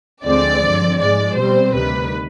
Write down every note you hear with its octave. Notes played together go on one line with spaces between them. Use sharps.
D2 D3 F3 G#3 C4 D5
G2 D3 F3 C4
G#2 F3 G#3 D5
B2 G3 C4 C5
D2 C3 D#3 G3 B4